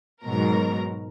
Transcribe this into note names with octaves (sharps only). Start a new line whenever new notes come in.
G#2 B2 F#3 A#4 A#5